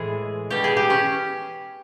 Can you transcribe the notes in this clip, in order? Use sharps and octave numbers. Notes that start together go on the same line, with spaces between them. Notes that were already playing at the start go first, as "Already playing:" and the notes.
Already playing: A2 E3 G#3 G#4
B2 G3 G4
G#4
G4
C#4